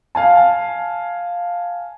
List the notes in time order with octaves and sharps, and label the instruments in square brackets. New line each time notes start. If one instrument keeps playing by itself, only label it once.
[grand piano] F5 G#5 A5